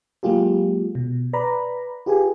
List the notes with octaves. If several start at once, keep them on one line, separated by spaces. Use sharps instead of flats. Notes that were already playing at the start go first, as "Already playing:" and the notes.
F#3 G#3 A#3 F4 G4 G#4
B2
B4 D5 A#5 B5
F4 G4 G#4 B4 G#5